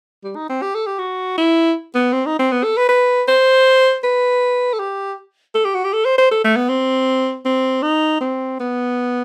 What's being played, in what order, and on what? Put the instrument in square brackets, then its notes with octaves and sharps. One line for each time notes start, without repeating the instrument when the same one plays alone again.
[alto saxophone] G3
D#4
C4
G4
A4
G4
F#4
E4
B3
C4
D#4
C4
B3
A4
B4
B4
C5
B4
A4
G4
A4
G4
F#4
G4
A4
C5
C5
A4
A3
B3
C4
C4
D#4
C4
B3